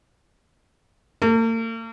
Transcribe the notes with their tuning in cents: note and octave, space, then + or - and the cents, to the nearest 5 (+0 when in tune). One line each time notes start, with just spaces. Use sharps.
A#3 -45